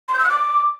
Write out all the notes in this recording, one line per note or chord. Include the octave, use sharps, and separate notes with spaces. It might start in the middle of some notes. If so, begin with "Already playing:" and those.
C6
G6
E6
F#6
D6